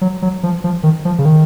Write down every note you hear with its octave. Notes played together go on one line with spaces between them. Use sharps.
F#3
F#3
F3
F3
D#3
F3
C#3
D#3